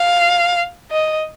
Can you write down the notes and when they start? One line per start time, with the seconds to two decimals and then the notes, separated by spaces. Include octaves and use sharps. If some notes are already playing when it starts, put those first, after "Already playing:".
Already playing: F5
0.91 D#5